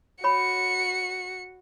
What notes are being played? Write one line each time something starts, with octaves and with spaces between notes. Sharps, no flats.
F#4 C#5 B5 C#7